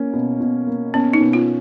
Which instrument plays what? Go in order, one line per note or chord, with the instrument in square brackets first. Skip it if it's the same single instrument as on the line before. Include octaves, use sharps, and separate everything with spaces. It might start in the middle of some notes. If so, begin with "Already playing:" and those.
Already playing: [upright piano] A#3 C#4
B2
B2
A#3
[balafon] B3 [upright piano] C#4
[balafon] D#4
[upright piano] B2
[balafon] F4